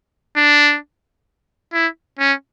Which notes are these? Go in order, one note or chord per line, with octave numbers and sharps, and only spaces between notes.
D4
E4
C#4